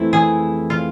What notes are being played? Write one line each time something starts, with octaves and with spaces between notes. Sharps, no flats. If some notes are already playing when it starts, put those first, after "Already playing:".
Already playing: F2 E3 A3 C4 E4
G#4
F4